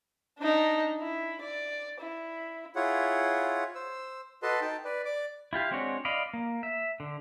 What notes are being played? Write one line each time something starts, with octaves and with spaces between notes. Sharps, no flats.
D4 D#4
E4
D5
E4
E4 F4 G#4 C#5 F#5
C5 E6
F#4 A4 B4 D#5 A5 C6
D#4 G5 A5
B4 D5
D5 D6
E4 F4 G4 F5
G#3 C4 D4 F#4 C#5
D5 D#5 F5 B5
A#3
E5
D3